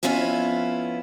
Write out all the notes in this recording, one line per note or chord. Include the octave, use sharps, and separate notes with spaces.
F2 B3 C#4 E4 F4 G#5